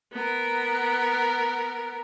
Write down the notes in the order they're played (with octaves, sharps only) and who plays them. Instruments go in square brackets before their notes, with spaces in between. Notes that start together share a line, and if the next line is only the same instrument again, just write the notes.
[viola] B3 A#4